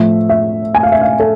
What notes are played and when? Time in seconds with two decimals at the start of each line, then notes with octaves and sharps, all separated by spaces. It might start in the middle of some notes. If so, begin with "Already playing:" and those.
Already playing: A2 F3 A3 E5
0.29 E5
0.75 G#5
0.83 F5
0.92 E5
1.01 F5
1.20 A4